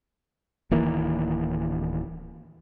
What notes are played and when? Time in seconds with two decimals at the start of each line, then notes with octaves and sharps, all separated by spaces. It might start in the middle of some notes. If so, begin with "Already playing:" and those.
0.71 D1 D#3 E3 A#3